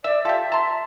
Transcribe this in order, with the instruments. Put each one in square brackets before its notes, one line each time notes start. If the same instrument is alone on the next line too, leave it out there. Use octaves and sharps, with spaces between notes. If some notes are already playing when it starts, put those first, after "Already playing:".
[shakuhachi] D5 [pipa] E5 [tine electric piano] E6
[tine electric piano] F4 A5 [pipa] G4 A4 [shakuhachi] E5
[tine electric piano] A5 [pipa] A#5 C6